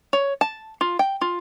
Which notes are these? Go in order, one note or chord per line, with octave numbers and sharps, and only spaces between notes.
C#5
A5
F4
G5
F4